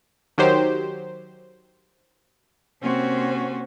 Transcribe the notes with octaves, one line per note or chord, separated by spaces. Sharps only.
D#3 F#3 G4 C5
C3 A#3 C4 C#4 F#4 C5